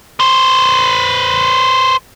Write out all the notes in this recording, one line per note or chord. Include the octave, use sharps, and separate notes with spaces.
B4 C5